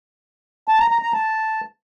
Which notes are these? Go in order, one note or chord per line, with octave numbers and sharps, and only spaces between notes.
A5
A#5
A#5
A#5
A5